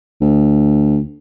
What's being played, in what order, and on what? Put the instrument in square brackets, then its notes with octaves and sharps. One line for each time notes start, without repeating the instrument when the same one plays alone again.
[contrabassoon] D2